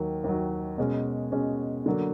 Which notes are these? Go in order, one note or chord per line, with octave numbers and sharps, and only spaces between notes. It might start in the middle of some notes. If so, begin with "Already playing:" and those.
Already playing: D#2 D#3 F#3
D#2 D#3 F#3
B2 G#3 C#4
B2 G#3 C#4
D3 F#3 A#3